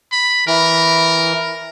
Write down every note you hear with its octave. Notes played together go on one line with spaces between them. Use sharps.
B5
E3 A#4